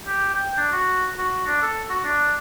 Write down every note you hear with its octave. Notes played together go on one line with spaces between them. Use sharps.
G4
G5
D4
F#4
F#4
D4
A4
F#4
D4